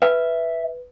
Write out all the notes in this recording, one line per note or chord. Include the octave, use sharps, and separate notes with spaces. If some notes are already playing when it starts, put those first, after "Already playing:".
B4 E5